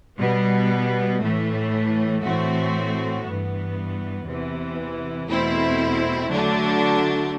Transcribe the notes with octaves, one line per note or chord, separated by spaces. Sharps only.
B2 G3 B3
A2 E3 A3
A2 E3 A3 C4 F#4
G2 E3 B3
E2 C3 E3
E2 B2 A3 C4 E4
D3 F#3 A3 D4